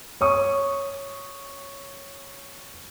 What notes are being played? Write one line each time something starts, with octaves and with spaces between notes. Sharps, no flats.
C#5 C#6 D#6